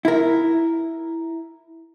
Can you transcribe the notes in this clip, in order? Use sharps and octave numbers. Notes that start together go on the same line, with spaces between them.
E4 A#4